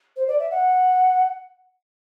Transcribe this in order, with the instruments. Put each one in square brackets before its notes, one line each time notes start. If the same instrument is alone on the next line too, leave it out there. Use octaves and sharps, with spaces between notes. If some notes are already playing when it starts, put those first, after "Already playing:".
[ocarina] C5
D5
E5
F#5